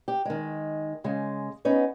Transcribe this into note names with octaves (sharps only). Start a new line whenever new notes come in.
G4
D#3 G#3
C#3 G#3
B3 C#4 D#4